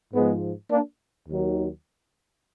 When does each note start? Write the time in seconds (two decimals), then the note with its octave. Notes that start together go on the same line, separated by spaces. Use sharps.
0.13 G#2 F3 G#3 B3
0.71 A#3 D4
1.29 D#2 D#3 F#3